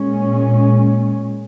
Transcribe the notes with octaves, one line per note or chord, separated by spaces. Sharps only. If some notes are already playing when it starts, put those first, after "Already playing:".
Already playing: A#2 G#3 C#4